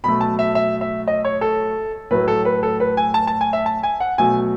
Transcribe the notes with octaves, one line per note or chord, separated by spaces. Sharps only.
B2 F#3 A3 B5
A5
E5
E5
E5
D#5
C#5
A4
A2 F#3 A3 B4
A4
B4
A4
B4
G#5
A5
A5
G#5
E5
A5
G#5
F#5
B2 F#3 A3 G#5